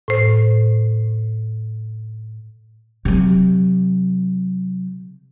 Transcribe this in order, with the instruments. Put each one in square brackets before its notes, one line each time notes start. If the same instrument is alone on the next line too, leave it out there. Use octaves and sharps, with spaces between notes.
[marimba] A2 C5
[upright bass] C3 F#3